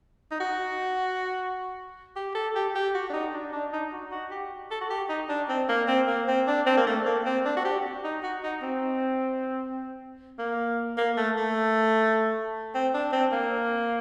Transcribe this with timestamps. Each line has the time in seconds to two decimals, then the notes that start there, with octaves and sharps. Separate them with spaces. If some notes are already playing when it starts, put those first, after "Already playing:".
0.31 D#4
0.40 F#4
2.16 G4
2.35 A4
2.56 G4
2.75 G4
2.94 F#4
3.10 D4
3.13 D#4
3.34 D4
3.52 D4
3.73 D#4
3.93 F#4
4.12 F#4
4.31 G4
4.71 A4
4.81 F#4
4.90 G4
5.09 D#4
5.29 D4
5.49 C4
5.69 A#3
5.88 C4
6.08 A#3
6.28 C4
6.48 D4
6.66 C4
6.77 A#3
6.87 A3
7.06 A#3
7.25 C4
7.45 D4
7.57 F#4
7.65 G4
8.04 D#4
8.23 F#4
8.43 D#4
8.62 C4
10.39 A#3
10.97 A#3
11.17 A3
11.37 A3
12.75 C4
12.94 D4
13.13 C4
13.32 A#3